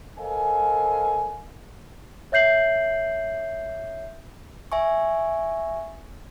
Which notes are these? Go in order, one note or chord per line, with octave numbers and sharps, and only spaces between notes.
A4 A#4 C5 D#5 F5 G#5
C#5 E5 G6 C7 F#7
E5 G#5 C#6